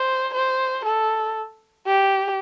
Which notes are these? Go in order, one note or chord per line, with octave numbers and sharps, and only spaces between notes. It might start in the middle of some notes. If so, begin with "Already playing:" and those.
Already playing: C5
C5
A4
G4